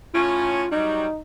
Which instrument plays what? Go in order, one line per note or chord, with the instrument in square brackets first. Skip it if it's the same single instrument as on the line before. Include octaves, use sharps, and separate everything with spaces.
[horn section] A2 C#4 [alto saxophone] F4
[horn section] F#3 G3 [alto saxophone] D#4